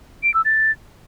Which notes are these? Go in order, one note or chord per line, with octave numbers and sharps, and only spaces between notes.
D7
E6
A6